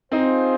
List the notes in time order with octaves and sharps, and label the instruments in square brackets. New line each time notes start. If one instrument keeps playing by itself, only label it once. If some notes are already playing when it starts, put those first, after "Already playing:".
[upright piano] C4 D#4 [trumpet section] F4 G#4 C5